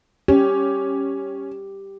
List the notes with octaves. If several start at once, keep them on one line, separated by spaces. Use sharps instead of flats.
C#4 G4